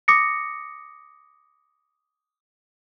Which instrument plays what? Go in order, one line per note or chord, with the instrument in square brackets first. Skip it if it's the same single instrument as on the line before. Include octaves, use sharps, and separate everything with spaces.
[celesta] D6 D#6 A#6 C#7